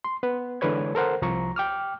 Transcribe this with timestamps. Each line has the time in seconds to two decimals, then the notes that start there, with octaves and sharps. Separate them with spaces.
0.04 C6
0.23 B3 B4
0.61 D3 E3 G#3 B4 C#5 G#6
0.95 A4 A#4 C5 F#5
1.22 C2 F3 A#5 C#6
1.56 G5 D6 F6